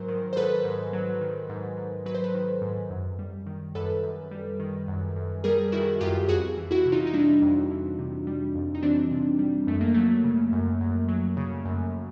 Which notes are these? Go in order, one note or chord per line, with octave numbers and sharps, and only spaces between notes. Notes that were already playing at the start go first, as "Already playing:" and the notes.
Already playing: G#2 F#3 A#4 C5
D#3
C5
G#2 A4 B4
G#2
F#3
D#3
G#2
G#2
F#3 B4
C5
A4 B4
D#3
G#2
F#2
G3
D#3
F#2 A4 B4
F#2
G3
D#3
F#2
F#2
G3 G#4 A#4
D#3 E4 F#4
F#2 F4 G4
F2 F#4 G#4
E3
E4 F#4
C3
D#4 F4
D#4
G3 D4 E4
F2
E3
C3
G3
F2
D#4
E3 C4 D4
C3
G3
F#2 A3
A#3
F#3 A3
C#3
F#2
F#2
F#3
C#3
F#2